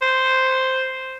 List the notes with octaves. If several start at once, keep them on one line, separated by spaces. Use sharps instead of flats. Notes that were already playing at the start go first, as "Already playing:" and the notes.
C5